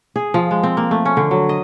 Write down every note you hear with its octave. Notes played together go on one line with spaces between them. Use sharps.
G#4
F3
G#3
C4
A#3
A3
C#4
D3
F#3
D#5